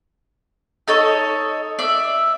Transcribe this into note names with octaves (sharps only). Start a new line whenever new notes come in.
D#4 A4 C#5 D#5
D5 E5